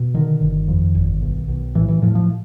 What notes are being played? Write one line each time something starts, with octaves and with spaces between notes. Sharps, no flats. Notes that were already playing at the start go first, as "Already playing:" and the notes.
Already playing: B2
D3 D#3
G1
F2
G1
B1
B1
A2 E3
E3
A2 F3
F3